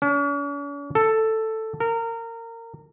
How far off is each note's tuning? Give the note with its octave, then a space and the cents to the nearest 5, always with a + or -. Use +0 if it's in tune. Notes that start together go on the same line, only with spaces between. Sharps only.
C#4 +45
A4 +5
A#4 -25